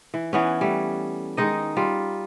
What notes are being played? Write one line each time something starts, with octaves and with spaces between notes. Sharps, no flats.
E3
E3 B3 C#4
G3 A3
D#3 G#3 D#4 D#5
G3 F4